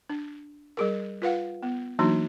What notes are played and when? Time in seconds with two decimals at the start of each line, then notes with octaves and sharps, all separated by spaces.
0.09 D4
0.77 G3 G#4 A#4
1.22 F4 B4 F5 F#5
1.63 B3
1.99 E3 F#3 A#3 D4 D#4 F#4